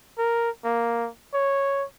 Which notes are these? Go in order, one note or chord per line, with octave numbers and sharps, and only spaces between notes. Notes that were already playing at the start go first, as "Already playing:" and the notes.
A#4
A#3
C#5